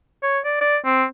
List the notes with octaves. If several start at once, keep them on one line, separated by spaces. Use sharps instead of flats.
C#5
D5
D5
C4